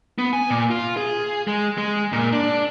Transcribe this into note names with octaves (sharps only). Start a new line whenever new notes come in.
B3
G#5
A#2
F4
G#4
G#3
G#3
A#2
D4